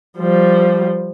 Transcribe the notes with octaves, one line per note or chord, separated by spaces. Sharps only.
F3 G3